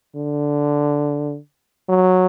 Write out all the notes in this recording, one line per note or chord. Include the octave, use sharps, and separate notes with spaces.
D3
F#3